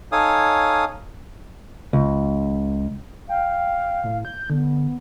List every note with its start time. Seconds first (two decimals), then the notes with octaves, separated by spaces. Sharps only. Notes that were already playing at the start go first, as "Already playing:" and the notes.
0.12 D#4 A4 C#5 F5 G#5 D#6
1.93 C#2
3.29 F5 G5
4.04 A2
4.25 G6
4.50 D3 B3